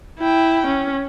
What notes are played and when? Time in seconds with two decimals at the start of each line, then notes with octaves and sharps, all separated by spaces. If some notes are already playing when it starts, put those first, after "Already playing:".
0.19 E4 G5
0.66 C#4